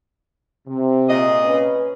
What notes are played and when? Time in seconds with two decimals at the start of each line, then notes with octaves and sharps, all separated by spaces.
0.68 C3
1.09 A#2 G#4 D#5
1.45 C#4 B4